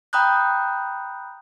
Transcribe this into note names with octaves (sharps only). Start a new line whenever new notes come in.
G5 A#5 B5 D#6 F#6 G6